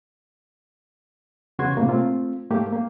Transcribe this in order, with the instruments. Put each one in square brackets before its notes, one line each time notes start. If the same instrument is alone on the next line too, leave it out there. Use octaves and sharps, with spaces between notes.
[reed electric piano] E2 C#3 F#4 B4 C6 G#6
A2 C3 A#3
A3 C4 F4
G#2 A3 A#3 G4
A#3